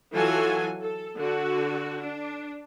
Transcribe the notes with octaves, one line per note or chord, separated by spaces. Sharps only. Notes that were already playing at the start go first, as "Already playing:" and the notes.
E3 F#3 F4 F#4 A4 G#5
A4
D3 F#4
D4